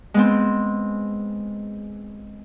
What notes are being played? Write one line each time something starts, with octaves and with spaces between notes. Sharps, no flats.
G#3 B3 C4